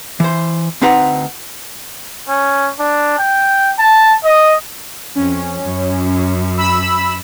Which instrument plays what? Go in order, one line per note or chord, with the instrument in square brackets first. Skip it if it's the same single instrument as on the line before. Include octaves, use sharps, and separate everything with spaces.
[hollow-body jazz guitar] E3 C5
D2 C4 D#4 B4 F#5 A#5
[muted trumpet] C#4
D4
G5
A5
D#5
[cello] F2 [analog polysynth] C#4
[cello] F#2
[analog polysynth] B5 E6